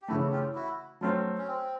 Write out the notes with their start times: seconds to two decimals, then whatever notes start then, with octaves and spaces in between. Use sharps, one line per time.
0.02 G4
0.08 C#3 E3 A3 E4 F#4
0.32 F4 G4
0.55 E4 F#4
1.01 F#3 A3 C4 F4
1.38 C#4
1.48 C4